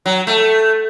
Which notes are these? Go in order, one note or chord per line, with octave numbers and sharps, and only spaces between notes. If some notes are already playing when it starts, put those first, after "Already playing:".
F#3
A3